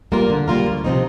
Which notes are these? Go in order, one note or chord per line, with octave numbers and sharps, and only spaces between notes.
G3 A#3 F4 A#4
D3
G3 A#3 F4 A#4
D2
C3 F3 C4 D#4